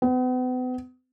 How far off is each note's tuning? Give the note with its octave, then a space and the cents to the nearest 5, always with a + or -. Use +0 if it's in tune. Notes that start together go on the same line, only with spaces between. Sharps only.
B3 +40